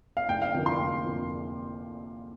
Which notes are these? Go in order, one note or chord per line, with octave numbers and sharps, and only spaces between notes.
F5
F1 G5
F5
F2 D3 F3 A#3 G5
C6
F1
F2 D3 F3 A#3